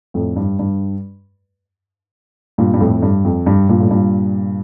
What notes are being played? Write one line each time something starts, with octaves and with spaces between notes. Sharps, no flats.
F2 A2
G2
G2
G2 A#2
G2
F2 A2
G2
F2
G2
G2 A#2
A2
G2 A#2